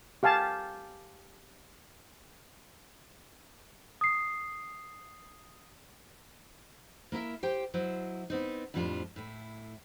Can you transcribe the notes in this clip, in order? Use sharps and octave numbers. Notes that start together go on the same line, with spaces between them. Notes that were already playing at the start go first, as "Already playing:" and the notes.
G4 F5 G#5 A5
D#6 C7
A#3 E4 A#4 E5
G4 C5 G5
F#3 E4 C5 D#5
B3 C4 D#4
F2 A2 F3 G3 D4 F4
A2 E4